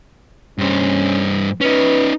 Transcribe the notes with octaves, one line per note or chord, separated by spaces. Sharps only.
G2 C#4 C5
C#4 D#4 B4